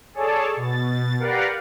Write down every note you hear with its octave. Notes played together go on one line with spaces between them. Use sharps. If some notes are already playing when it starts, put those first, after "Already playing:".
G#4 A4 C#5 D5 A5
B2 A6
G4 A#4 B4 D5 F5 F#5